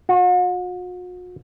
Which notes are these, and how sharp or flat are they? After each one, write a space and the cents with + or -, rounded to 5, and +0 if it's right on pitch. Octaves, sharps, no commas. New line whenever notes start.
F#4 -45